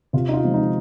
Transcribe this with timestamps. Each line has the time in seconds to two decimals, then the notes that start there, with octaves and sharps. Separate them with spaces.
0.13 C3 F4
0.29 D#4
0.34 F4
0.44 F3 G#3 C4
0.54 D#4